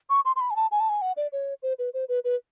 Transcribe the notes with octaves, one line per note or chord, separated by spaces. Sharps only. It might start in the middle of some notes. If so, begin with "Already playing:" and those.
C#6
C6
C6
B5
G#5
A5
G#5
A5
G#5
F#5
D5
C#5
C5
B4
C5
B4
B4